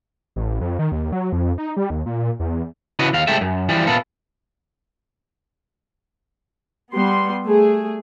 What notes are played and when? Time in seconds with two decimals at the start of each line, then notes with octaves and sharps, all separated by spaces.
0.36 A1
0.61 F2
0.79 D#3
0.92 D#2
1.12 F#3
1.32 F2
1.58 D#4
1.77 G3
1.90 D#2
2.06 A#2
2.39 E2
2.99 C#3 E4 F#4 B4 D#5
3.13 D#2 F5
3.27 C2 G#3 A3 G4 A4 E5
3.41 F#2
3.69 E3 F3 G3
3.87 A#2 B3 E4 F4 A4
6.93 G3 B3 C6
7.44 A3 G#4